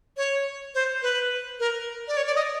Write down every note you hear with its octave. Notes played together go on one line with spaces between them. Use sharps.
C#5
C5
B4
A#4
D5
C#5
D5
D#5